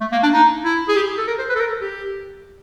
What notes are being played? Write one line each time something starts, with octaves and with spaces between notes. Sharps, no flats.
A3
A#3
D4
D#4
E4
G#4
G4
A4
A#4
C5
B4
A4
A#4
A4
G4